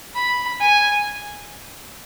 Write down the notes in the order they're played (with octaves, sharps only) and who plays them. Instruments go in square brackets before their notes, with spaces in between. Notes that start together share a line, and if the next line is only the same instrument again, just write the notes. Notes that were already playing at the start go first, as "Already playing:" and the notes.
[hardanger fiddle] B5
G#5